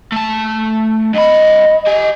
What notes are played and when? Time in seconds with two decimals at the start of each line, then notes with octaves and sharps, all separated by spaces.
0.12 A3 A5
1.14 G2 D#5 B5
1.87 G4 G#5